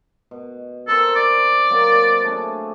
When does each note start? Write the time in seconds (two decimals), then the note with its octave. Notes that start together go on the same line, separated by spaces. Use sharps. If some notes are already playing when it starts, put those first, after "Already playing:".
0.31 B2
0.88 C4 A4 A#4
1.16 D5
1.70 F#3 A#3 C4
2.24 A3 D4 G#4